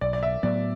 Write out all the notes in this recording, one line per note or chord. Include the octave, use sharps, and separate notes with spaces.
B1 D5
D5
E5
A2 F#3 B3 D5